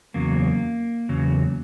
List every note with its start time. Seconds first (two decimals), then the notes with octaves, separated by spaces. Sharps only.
0.14 E2 C#3 F#3 A#3
1.09 E2 C#3 F#3